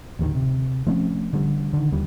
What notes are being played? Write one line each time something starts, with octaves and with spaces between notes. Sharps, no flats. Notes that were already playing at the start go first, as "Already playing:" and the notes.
A1 D#2 D3 D#3
C3
F3 A3 C4 C#4
D3 G3
D3 D#3
D#2 G3